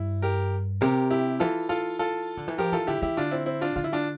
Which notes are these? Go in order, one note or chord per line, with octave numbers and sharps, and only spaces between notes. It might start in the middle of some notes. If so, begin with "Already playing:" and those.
Already playing: G2 E4
G4 A#4
C3 G4 A#4
E4 G4
E3 F4 A4
F4 A4
F4 A4
D3
E3
F3 G4 A#4
E3 F4 A4
D3 E4 G4
E3 E4 G4
D3 D4 F4
C4 E4
C4 E4
D4 F4
D3 F4
E4
D4 F4